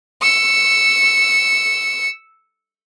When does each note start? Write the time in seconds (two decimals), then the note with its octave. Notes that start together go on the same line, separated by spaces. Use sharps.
0.22 E6 C#7